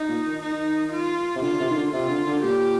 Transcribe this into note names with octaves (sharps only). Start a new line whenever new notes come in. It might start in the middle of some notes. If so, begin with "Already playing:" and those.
Already playing: D#4
A#2
D#3
D#4
D#3
F4
C3
D3 F4
D3
C3
D#3
D3
C3 F4
D3
D3
A#2 G4